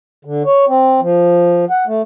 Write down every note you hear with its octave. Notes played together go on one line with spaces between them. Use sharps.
D3
C#5
C4
F3
F#5
A3